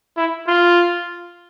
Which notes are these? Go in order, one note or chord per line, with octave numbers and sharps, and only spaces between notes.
E4
F4